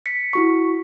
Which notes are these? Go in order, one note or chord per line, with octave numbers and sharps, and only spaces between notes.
B6 C#7
E4 F#4 C#6